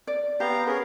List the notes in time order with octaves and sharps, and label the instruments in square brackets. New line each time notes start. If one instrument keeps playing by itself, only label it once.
[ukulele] D5
[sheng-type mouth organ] B3 F5 A#5 [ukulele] G4
[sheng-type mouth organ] C#4 G#4 A#4 [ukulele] B4